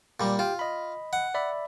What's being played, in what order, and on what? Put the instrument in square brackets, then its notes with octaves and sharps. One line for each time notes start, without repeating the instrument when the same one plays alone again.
[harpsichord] A#2 G3
[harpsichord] F4 [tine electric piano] G4 G5
[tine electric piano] D#5 B5
[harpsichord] F#5
[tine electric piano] D5 E5 B5